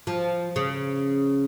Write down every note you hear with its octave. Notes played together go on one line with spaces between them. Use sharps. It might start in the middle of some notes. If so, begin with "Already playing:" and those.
F3
C#3